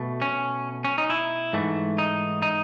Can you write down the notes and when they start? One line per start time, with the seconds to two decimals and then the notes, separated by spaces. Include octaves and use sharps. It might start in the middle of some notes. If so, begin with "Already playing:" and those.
Already playing: B2 A3
0.22 C#4
0.85 C#4
0.98 D#4
1.10 E4
1.53 G#2 E3 A3
1.98 D#4
2.42 D#4